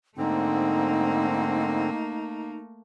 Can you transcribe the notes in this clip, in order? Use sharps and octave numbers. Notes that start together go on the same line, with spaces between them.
G#2 D3 A3 A#3 C4 D#4